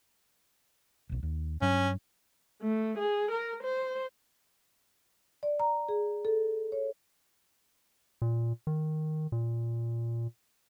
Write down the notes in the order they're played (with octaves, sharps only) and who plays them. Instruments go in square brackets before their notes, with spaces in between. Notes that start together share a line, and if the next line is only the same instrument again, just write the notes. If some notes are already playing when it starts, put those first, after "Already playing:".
[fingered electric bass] D#1 B1
D#2
[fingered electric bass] G2 F#3 [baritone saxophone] C#4
[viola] A3
G#4
A#4
C5
[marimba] D5
A#5
G#4
A4
C#5
[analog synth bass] A#2
D#3
A#2